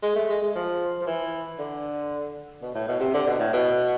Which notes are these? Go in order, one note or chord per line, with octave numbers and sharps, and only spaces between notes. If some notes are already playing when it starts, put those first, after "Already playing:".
G#3
A3
G#3
G#3
F3
F3
E3
D3
B2
A2
B2
C3
D3
B2
A2
B2